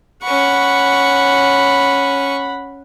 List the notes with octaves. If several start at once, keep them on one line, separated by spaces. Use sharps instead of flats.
C#4 F#5 B5 C#6